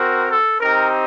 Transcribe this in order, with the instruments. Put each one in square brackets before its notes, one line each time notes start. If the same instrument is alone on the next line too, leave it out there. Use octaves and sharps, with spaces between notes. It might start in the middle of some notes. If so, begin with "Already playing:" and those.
Already playing: [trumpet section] C4 F#4 A#4
A4
C4 D#4 G4 A#4